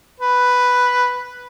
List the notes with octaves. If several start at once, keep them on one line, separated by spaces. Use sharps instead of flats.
B4